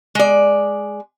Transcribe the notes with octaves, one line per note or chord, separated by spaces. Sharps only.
G#3 D5